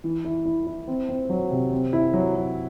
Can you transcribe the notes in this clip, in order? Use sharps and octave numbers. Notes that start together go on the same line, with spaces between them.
E3
E4
E4
E4
C4
C4
F#3
C3
C4
E4
F#3
F#3